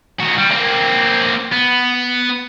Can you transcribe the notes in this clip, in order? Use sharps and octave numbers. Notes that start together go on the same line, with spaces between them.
D#3 F#4
G3
A#3 C4
B3